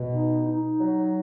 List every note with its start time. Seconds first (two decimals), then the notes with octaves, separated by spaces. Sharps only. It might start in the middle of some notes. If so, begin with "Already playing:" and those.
Already playing: B2
0.13 D#4
0.47 D#4
0.79 F#3